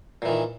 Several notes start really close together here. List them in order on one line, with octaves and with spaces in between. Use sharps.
A#2 E3 D#3